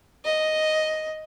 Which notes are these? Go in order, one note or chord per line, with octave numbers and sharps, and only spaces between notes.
D#5